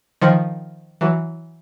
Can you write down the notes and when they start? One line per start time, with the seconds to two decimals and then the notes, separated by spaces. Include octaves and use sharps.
0.22 D#3 F3
1.01 E3 F#3